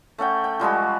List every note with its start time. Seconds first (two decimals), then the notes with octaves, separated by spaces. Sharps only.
0.18 A3 C#4 F#5 G5
0.44 G5
0.60 F3 G3 G#3 F#4